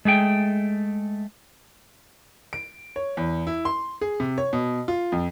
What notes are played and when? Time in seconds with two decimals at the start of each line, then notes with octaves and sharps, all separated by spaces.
0.05 G#3 A3 G#4 G5
2.53 D7
2.96 C#5
3.17 E2
3.47 E4
3.65 C6
4.01 G#4
4.20 C3
4.38 C#5
4.53 B2
4.88 F4
5.12 F2